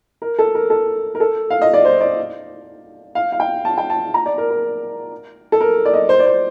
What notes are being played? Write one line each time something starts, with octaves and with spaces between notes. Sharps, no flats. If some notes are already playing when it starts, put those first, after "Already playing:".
A#4
A4
A#4
A4
A#4
A4
F5
D#5
D5
C5
D5
F5
F5
G5
A5
G5
A5
A#5
D5
A#4
A#4
A4
A#4
D5
D#5
C5
D5
C5